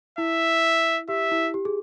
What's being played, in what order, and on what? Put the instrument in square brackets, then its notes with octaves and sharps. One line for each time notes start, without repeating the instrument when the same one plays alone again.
[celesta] E4 [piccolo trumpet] E5
[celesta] G4 [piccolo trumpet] E5
[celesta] E4
G4
G#4